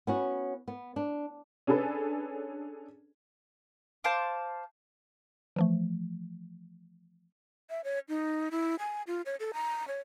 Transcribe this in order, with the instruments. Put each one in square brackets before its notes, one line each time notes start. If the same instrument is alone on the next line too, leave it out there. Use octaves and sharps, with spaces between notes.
[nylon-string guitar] B3 C#4 F#4
B3
D4
[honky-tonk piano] C#4 D4 G#4 A4 B4
[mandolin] C5 F5 A5 D6
[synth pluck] E3 F3 A3
[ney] E5
C#5
D#4
E4
G#5
F4
C#5
A4
A#5
C#5